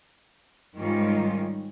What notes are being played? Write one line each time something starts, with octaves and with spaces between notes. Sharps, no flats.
G#2 D#3 G3 C#4 D#4 F4